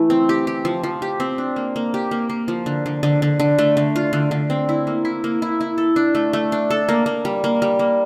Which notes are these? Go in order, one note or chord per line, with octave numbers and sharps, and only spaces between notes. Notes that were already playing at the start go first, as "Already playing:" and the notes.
Already playing: E3 A3
C4
G4
G4
F3
F3
G4
C4
D4
A#3
A#3
G4
A#3
A#3
F3
D3
D3
D3
D3
D3
A3
D3
F4
D3
D3
C4
E4
A#3
E4
A#3
E4
E4
A4
D4
A3
A3
D4
A4
A#3
A#3
G3
A#3
G3
A#3